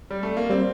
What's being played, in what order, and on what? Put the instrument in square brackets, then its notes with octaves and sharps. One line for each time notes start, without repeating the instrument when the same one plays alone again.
[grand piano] G3
A3
A#3
[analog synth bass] G3 [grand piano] C4